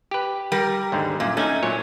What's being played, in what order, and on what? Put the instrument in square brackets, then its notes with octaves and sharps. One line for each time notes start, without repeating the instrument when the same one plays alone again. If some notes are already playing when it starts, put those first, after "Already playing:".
[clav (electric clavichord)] G4 B4
[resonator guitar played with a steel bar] G3 A#4
[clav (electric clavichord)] D#2 G#2 D3
[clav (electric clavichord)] F#2 [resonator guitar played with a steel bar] A#2
[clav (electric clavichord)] A3 D#4 G#5 [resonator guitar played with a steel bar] C#4
[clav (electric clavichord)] A#2 F#3 C#5